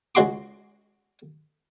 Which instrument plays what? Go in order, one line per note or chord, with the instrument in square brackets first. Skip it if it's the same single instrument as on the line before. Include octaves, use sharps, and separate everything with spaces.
[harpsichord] C#2 G#3 F#4 C6 D6